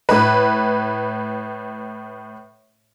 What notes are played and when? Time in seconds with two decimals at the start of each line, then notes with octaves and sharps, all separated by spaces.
0.09 A2 B4